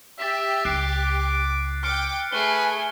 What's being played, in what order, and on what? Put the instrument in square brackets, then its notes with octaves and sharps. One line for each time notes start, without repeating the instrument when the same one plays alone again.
[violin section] G4 [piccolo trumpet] E5 [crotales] A6 B6
[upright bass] C#2 [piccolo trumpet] D6 [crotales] F#6 C7 D7
[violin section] G5 D6 [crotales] F6 F#6 C#7
[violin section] A3 G#4 G#5 [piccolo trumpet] B4 [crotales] G7